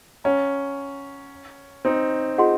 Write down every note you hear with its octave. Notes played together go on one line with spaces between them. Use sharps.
C#4 C#5 F#5 A#5
C4 D#4
F4 G#4 D#5 F#5 C6